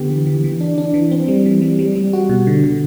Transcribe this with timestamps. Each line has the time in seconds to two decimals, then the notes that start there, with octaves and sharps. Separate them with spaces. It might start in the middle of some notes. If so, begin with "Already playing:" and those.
Already playing: D3 B3 G4
0.10 E3
0.27 E3
0.44 E3
0.61 D4
0.78 D4
0.94 E3
1.11 C4
1.28 G3
1.46 E3
1.62 G3
1.79 G3
1.95 G3
2.13 F#4
2.29 B2
2.47 D3
2.64 D3